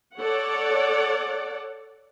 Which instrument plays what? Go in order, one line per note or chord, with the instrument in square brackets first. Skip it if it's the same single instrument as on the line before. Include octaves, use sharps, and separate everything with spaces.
[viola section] A4 C#5 D5 F#5